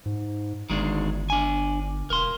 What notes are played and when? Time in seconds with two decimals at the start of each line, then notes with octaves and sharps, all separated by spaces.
0.06 G#2
0.70 G1 D#3 G#3 D4
1.30 D4 G#5
2.10 E1 A#4 C6